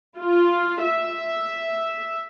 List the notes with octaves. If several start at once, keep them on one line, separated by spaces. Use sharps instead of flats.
F4
E5